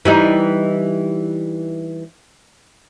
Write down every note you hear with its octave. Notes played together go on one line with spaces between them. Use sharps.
E3 G3 D#4